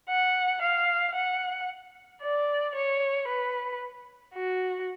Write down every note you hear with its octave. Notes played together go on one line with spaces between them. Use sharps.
F#5
F5
F#5
D5
C#5
B4
F#4